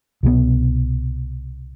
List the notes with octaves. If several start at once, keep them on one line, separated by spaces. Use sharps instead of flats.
C2 B2 E3 B3